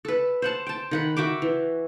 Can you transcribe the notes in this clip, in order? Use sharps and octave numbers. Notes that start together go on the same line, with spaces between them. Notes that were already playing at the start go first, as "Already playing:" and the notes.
A4 B4
C5 F#5 A5
G5 A5
D#3 F#5 B5
F#4 E5 G5 D6
E3